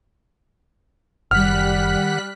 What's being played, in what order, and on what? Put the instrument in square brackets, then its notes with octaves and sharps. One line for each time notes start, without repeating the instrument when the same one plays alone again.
[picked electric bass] F#1 [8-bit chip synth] D#3 F#5 [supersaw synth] G3 F#6 B6 [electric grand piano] F6